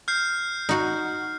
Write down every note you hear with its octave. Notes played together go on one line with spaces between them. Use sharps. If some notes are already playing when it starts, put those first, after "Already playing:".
F6 G6 C7
D#4 F#4